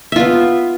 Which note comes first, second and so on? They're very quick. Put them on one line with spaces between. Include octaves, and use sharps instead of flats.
E5 F4 B3